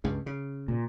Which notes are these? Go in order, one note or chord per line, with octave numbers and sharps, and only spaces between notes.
C#2 G2 C#3
C#3
A#2